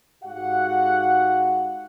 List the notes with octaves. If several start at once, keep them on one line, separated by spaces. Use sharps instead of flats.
G#2 F#4 G4 F5 F#5